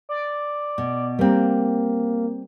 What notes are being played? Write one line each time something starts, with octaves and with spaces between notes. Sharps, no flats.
D5
B2
G3 A#3 C4